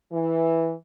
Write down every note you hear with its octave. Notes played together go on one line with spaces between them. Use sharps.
E3